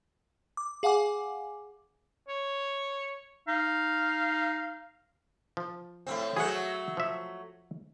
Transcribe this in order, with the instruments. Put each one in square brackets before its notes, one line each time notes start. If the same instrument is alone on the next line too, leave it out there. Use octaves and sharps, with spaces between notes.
[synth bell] D6
G#4 F5 F#5 G#5 D6
[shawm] C#5
[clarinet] D#4 [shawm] F5
[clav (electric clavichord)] F3
[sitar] A2 C3 C4
[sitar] F#3 A3 F#4 [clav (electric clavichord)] G#4 F#5
[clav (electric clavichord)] F3 E5